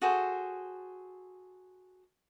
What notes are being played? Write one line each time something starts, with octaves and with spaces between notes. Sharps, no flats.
F#4 G#4 A4 C5